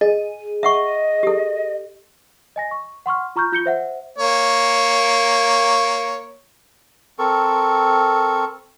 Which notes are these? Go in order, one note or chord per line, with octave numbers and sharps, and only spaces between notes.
G#4 D#5
D#5 E5 F#5 C#6
G4 A4
D#5 G#5 A#6
C#6
F#5 C6 C#6 F6
F4 A#5 C#6 F6 G6
F4 G6 C#7 G7
C5 E5 F#5
A#3 C#5
C4 A4 A#4 C#6